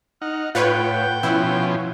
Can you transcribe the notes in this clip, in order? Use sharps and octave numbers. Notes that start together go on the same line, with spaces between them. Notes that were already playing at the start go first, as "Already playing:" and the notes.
D#4 F#5 F6
A2 F4 B4 C#5 F#5 G5 G6
B2 F3 C#4 E4